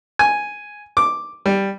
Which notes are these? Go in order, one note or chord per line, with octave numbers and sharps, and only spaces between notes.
G#5
D6
G3